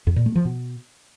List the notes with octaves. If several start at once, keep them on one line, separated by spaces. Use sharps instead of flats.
F2
A#2
A3
F3
B2